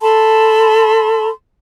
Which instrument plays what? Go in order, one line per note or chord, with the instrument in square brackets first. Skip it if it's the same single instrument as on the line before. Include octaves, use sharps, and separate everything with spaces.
[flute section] A4 A5 B5 C6